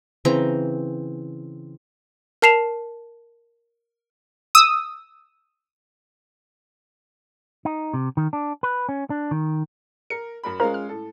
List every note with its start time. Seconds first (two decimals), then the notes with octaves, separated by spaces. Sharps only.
0.25 C#3 E3 C4 A#5
2.42 A#4 A5 C7 E7 F7
4.55 D#6 E6
7.65 D#4
7.94 C3
8.17 D#3
8.33 D4
8.63 B4
8.89 C#4
9.10 D4
9.31 D#3
10.10 A#4 C#7
10.43 F#2 A#4 B5
10.60 G#3 C#4 F4 A#4 C5 A#5
10.74 F6
10.89 A2 A4